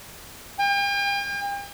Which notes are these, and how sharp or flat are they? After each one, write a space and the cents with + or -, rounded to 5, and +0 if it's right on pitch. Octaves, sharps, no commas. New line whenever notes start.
G5 +40